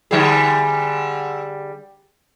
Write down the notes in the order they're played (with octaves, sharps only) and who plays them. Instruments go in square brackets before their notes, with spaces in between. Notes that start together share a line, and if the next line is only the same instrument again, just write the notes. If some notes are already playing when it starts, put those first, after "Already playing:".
[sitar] D3 G3 G#4